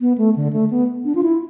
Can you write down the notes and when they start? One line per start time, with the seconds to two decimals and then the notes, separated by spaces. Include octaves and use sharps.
0.01 B3
0.18 A3
0.36 D3
0.53 A3
0.70 B3
1.05 D4
1.15 F4
1.23 E4